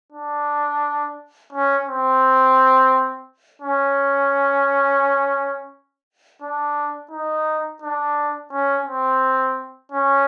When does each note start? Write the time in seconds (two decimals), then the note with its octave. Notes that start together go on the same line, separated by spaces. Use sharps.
0.12 D4
1.52 C#4
1.87 C4
3.62 C#4
6.42 D4
7.11 D#4
7.82 D4
8.52 C#4
8.86 C4
9.92 C#4